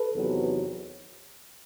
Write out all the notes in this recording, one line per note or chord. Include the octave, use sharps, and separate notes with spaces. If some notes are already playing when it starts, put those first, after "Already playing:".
Already playing: A4 B4
E2 C3 D#3 F#3